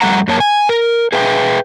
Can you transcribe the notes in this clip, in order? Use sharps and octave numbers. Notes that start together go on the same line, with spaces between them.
F2 G3 A3 F#5 A#5
F#2 A#3 C#5 A5
G#5
A#4
G#4 B4 E5 G5